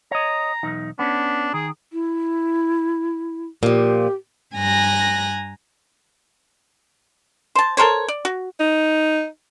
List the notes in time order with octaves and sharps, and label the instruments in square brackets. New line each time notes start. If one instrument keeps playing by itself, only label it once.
[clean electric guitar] C#5 D#5 [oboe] A#5
[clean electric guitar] B1 E2 D#4
[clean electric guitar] B3 C#4 [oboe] D4
[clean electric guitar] D#3 [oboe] G#4
[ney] E4
[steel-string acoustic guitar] A#2 F3 [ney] G4
[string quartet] G2 G#5 A#5 F#6 A#6
[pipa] C5 A5
A4 A#4 C5 C#5
D5
F#4
[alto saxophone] D#4